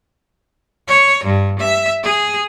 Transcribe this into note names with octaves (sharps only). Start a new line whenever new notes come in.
C#5
G2
E5
G#4